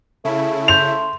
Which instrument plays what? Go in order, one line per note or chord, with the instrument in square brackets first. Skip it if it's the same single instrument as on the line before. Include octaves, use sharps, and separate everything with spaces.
[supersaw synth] C#3 E4 [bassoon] A3
[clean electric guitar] C5 [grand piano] F7